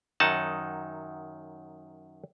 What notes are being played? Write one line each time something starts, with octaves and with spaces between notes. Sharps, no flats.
F#2 D#3 F#3 D#4 F#5 A5